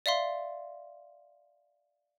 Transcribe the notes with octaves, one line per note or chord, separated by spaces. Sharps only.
D5 E5 F5 C6